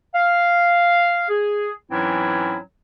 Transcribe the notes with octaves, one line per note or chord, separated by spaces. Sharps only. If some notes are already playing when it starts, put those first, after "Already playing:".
F5
G#4
G#2 E3 F#3 C4 C#4 E4